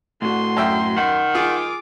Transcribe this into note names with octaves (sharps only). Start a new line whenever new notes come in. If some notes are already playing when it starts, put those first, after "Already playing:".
A2 D3 F#4 C6
F#2 E5 G5
D#3 F#5
F4 G#4 D6